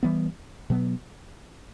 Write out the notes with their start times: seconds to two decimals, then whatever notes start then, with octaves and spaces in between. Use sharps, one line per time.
0.03 E3 G3 B3
0.70 B2 F#3 B3